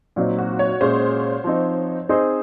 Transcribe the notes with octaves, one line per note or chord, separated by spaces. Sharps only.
A#2 F#3 C4 D#4
F#4
C#5
A#2 G#3 C#4 G#4 C5
F3 C4 D#4
C4 D#4 G#4 C5 D#5